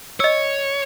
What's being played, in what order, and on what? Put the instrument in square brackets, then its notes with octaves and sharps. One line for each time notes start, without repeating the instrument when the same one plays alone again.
[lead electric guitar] C#5 [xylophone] D#5 E6